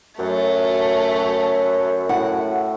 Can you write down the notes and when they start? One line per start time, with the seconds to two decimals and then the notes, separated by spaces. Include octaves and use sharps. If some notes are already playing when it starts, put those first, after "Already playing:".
0.19 F#2 F#3 A3
1.16 F#4 C#5
2.09 A2 E4 F#5